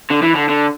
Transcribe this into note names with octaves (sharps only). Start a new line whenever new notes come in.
D3
E3
D3
D3